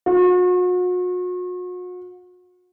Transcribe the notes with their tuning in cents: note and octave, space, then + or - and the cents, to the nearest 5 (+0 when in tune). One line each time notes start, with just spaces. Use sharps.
F#4 -40